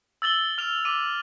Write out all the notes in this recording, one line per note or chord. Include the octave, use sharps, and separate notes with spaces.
E6 A6 F#7 G7
F6 F7
D6 D#7